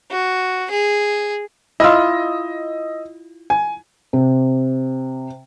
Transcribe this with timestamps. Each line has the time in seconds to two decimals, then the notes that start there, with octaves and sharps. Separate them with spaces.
0.11 F#4
0.71 G#4
1.80 E4 F4 D#5 D#6 E6
3.50 G#5
4.13 C3